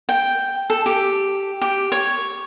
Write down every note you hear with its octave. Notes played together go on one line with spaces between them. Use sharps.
G5
A4
G4
G4
C#5